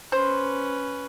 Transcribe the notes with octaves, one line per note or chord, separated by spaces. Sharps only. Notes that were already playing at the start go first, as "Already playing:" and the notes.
C#4 B4 C5